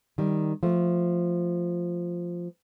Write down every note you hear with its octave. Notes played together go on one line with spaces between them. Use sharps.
D#3 G3
F3 A3